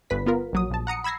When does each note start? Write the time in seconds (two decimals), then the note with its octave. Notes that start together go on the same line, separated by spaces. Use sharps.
0.10 G1 B4 B6
0.26 B3 F4 A#4
0.53 A#1 F#3 D#6
0.71 A#1 A5
0.87 F#5 A#5 D#6 C#7
1.04 B5 E6 G#6 A#6 C7